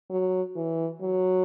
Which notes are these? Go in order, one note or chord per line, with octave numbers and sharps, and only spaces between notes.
F#3
E3
F#3